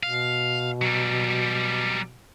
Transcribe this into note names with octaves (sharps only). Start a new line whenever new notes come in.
B2 F5
F#3 G3